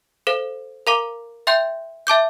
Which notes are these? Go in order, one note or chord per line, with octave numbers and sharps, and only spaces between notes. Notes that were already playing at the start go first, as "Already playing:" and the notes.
A4 C5 F5
A#4 F5 A#5 D6
E5 G5 C6 G6
E5 A5 D6 G6